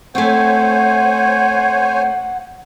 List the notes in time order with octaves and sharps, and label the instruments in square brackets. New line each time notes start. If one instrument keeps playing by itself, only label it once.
[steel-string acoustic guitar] A3 C4 [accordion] C5 C#5 G#5 [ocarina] F#5